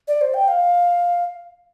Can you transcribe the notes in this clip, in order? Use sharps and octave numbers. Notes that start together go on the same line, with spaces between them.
D5
C5
G5
F5